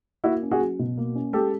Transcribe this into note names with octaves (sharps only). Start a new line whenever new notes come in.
A#3 E4 F#4
C#4
F#4 G#4
F#3
B2
A#3
C#4
G#3 G4 A4